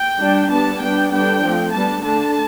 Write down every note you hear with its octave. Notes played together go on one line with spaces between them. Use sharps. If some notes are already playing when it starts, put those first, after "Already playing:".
Already playing: G5
G3 D4
G3 B3 D4 A5
G3 B3 D4 G5
D3 G3 B3 D4 G5
F3 A3 C4
G3 B3 D4 A5
D3 A3 D4 A5